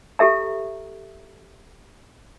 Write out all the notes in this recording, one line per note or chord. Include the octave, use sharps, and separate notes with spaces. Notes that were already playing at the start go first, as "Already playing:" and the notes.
G4 A4 E5 A#5